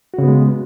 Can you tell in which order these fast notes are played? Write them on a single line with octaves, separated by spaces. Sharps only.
F#4 C#3 B3 G#3